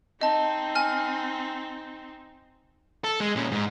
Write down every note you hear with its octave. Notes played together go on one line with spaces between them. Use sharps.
C4 D#4 D#5 A5
G#5 F6
A4
G#3
A#2 C#4
G#2